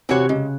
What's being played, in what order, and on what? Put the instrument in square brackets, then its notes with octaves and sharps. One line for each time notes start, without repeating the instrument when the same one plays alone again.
[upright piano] C3 [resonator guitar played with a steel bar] E3 C4 F#4 C#5
[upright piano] C#3 [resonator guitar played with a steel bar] G#3